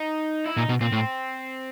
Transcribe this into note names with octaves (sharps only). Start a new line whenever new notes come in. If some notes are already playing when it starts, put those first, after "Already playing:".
Already playing: D#4
E4
A#2 D#4
B2
A#2 C4
A2